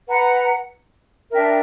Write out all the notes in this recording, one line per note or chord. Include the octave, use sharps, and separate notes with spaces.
B4 F#5 A#5
D4 A#4 E5 G5